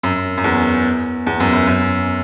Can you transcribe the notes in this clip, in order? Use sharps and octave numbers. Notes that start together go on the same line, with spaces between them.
F#2
F#2
E2
E2
F#2
F#2
F#2